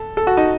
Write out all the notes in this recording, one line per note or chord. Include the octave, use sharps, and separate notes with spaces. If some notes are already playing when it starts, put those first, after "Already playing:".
Already playing: A4
A4
F#4
D#4